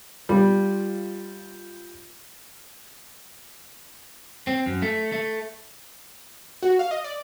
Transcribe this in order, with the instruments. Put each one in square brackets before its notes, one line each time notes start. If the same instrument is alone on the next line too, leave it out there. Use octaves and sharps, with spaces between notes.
[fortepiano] G3 [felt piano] F4
[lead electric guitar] C4
F#2
A3
A3
[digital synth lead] F#4
F5
D#5
D5